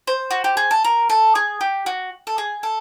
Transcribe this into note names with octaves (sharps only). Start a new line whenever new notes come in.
C5
F#4
G4
G#4
A4
A#4
A4
G#4
G4
F#4
A4
G#4
A4